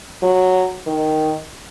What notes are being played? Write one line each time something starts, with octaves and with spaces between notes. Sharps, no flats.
F#3
D#3